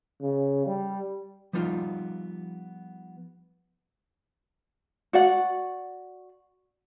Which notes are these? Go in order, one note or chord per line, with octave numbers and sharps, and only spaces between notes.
C#3
G3
F3 G3 B3 D#4 F4
F#4 D5 F#5